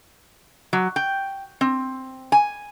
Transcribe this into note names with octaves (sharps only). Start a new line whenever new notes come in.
F#3
G5
C4
G#5